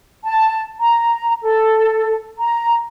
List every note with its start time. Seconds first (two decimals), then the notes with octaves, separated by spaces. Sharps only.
0.24 A5
0.79 A#5
1.42 A4
2.40 A#5